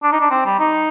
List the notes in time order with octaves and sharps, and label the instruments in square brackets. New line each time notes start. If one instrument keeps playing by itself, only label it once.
[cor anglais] D4
D#4
D4
C4
G3
D#4